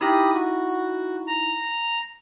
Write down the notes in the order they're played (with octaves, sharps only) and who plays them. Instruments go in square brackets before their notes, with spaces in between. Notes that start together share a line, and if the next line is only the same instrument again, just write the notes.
[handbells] D#4 E4 [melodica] G4 B5 D#6
[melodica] F#4
A#5